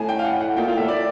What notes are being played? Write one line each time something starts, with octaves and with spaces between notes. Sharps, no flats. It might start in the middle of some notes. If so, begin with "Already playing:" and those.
Already playing: A2 G#5
G5
F5
F#5
F#5
A#2 G5
A#2 F5
A2 E5
D5